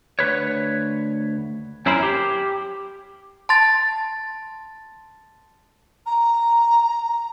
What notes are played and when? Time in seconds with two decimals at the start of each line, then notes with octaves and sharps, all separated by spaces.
0.19 D2 B4 C#5
1.86 F#2 C#4 E4 A#4 C5 B5
2.03 G4
3.49 A5 C6 A6
6.06 A#5